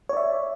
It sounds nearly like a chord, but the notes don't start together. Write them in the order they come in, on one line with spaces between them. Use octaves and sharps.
C#5 D5 E5